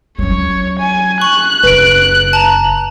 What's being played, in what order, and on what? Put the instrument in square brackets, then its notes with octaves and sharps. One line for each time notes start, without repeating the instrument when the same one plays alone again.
[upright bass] F#3 C#4 [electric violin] C#5
[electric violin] G#5
[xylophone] C#6 [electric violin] F#6
[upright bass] F#1 [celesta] B4 D7
[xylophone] A5 A#5